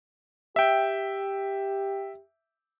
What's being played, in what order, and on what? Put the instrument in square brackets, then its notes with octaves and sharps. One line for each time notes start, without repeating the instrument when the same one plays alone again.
[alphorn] G4 [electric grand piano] E5 G5